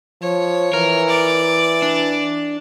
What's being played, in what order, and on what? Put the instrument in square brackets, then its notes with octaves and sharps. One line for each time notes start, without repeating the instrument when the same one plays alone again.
[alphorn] F3 [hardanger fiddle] C#5
[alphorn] E3 [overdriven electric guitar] A#4
[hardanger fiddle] D5
[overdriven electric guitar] D4